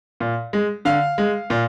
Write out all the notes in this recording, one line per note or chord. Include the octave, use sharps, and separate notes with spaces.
A#2
G#3
D3 F5
G#3
A#2